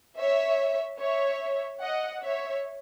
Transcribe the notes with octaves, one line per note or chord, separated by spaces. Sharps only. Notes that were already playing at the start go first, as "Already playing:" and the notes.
C#5 E5
C#5 E5
D#5 F#5
C#5 E5